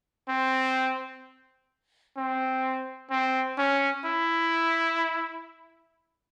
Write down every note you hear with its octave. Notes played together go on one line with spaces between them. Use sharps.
C4
C4
C4
C#4
E4